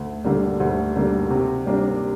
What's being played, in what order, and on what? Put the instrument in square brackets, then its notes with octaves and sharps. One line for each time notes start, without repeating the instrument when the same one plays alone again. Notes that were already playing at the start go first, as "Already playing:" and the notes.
Already playing: [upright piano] D2
D3 G3 A#3
D2
D3 G3 A#3
C3
G3 A#3 D4